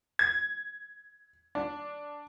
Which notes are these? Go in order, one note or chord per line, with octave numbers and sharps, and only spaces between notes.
G#6
D4